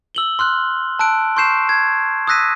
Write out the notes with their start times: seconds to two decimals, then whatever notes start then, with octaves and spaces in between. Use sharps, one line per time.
0.15 E6 F#7 G7
0.39 C6 F6 F#6
0.99 A5 E6 F#6 D7
1.37 C6 C#6 G6 C7 E7
1.69 G#6
2.27 D#6 E6 F#6 A#6 B6 D#7